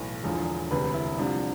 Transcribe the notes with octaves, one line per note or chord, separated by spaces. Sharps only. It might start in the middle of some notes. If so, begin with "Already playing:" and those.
Already playing: B1 A2 E3
E1 E2 D3 F3
E1 D2 C3 B4
E4
C2 C3 F3 D4